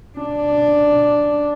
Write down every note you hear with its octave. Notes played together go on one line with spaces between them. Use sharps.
D4